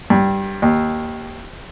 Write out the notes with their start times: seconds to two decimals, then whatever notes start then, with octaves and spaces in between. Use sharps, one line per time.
0.10 G2
0.62 D#2